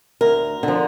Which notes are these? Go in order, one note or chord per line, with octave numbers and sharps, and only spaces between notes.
D2 A#4
D3
F3